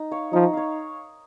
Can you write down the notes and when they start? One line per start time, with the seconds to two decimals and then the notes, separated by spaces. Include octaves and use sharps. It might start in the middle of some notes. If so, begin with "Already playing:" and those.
Already playing: D#4
0.12 C#5 F5
0.33 F3 D#4
0.53 C#5 F5